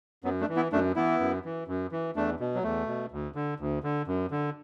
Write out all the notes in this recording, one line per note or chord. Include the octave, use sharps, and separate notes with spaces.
F#2 F#3 B3
A3 D4
E3
B3 E4
F#2 A3 D4
E3 B3 E4
F#2
E3
F#2
E3
E2 A3 D4
B2
F#3
E2 A3
B2
D2
D3
D2
D3
F#2
D3